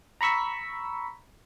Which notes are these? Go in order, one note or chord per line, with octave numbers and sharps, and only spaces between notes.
A#5 B5 C#6 E6 B6